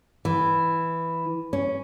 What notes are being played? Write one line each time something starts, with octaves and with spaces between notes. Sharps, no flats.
E3
C#4